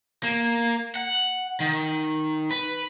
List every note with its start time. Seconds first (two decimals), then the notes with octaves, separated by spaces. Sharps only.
0.23 A#3
0.96 F#5
1.60 D#3
2.51 B4